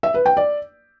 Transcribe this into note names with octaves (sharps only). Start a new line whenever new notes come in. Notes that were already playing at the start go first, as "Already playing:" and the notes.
E5
B4
G5
D5